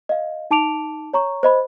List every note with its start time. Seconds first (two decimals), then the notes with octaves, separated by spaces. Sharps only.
0.09 D#5 F5
0.51 D#4 A5 D6 D7 F7
1.13 C#5 A#5 C#6
1.43 C5 D#5 B5